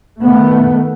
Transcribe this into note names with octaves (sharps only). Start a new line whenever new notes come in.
D#3 A3 B3